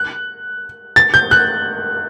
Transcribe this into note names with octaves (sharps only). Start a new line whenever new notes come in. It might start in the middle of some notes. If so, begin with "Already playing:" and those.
Already playing: F#6
A6
G6
F#6